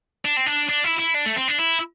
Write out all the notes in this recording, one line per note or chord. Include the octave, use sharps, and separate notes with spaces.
D4
C4
D4
D4
E4
E4
D4
A3
C4
D4
E4